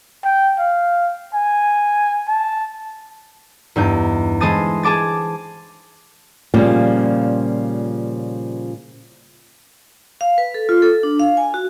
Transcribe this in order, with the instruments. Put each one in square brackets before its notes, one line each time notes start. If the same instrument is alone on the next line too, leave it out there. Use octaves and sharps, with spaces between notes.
[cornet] G5
F5
G#5
A5
[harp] E2 G2 D#4 G6
E3 G#3 C5 A5 D#6 A6
G#4 A5 D6 A6
[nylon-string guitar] A#2 C#3 F3 G3 A#3 F4
[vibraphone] F5
B4
A4
F4
A4
D4
F5
G#5
F#4